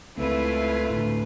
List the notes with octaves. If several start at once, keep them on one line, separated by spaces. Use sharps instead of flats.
C#2 A3 C4 E4 F4 B4
D2 A2